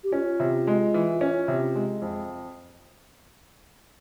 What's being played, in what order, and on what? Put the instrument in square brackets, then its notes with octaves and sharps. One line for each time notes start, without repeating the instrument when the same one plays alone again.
[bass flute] G4
[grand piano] C#4 [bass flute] F4
[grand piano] C3
G#3
E3
C#4
C3
G#3
F2